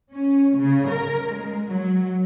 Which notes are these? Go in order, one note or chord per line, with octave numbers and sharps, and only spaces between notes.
C#4
C#3
A#4
G#3
F#3